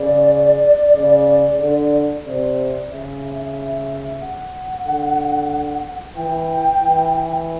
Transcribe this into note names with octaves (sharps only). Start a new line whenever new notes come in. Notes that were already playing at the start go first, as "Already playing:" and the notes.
Already playing: C#3 D5
C#3
D3
C3 D5
C#3 E5
E5
F#5
D3
E3 G5
E3